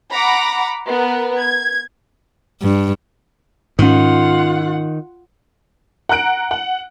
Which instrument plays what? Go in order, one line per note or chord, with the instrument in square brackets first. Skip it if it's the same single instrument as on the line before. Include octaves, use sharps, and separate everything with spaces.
[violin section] F#5 A#5 B5 D6
B3 A#4 B4
G#6
[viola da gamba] G2
[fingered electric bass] G#2 C#4 [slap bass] D#3 [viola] F4 F#5
[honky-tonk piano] F#5 A#5 F#6 D7
F#5